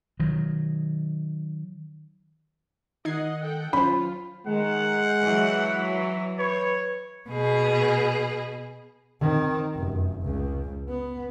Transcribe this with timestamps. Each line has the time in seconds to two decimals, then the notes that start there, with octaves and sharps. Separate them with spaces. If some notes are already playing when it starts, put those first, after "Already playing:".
0.20 D#3 F#3
3.05 D#3 D#4 D#5 F#5 G#6 C7
3.42 A4 F#5 G5
3.73 F#3 C#4 F4 C5 B5
4.47 D#3 G#3 F#5
5.21 E3 F#3
6.39 B4 C#5
7.30 B2 G#4
9.21 D#3 C4
9.73 F1 F#2
10.22 C#2
10.89 B3